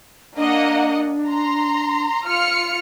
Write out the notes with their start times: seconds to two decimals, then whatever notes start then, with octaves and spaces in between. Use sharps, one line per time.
0.37 A#3 D4 D#5 F#5
1.26 A#5 C6
2.26 F4 F6 C#7